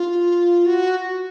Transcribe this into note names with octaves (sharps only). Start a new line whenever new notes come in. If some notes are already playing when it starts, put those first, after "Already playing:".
Already playing: F4
F#4